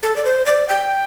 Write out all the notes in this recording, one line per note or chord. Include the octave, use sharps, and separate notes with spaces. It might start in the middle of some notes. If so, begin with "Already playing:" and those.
A4
D5
C5
D5
G5